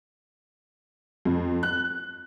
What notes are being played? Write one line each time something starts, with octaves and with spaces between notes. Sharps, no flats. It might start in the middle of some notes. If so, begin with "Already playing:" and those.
F2
F#6